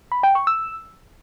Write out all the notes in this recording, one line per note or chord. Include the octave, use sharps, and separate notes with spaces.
B5
G5
C#6
E6